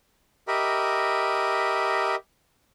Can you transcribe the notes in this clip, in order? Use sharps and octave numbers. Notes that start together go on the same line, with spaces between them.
G4 A#4 D#5 E5 B5